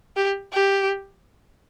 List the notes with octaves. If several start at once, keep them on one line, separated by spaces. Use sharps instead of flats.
G4
G4